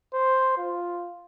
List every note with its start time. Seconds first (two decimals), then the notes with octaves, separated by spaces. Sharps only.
0.14 C5
0.58 F4